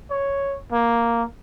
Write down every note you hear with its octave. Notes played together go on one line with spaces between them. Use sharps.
C#5
A#3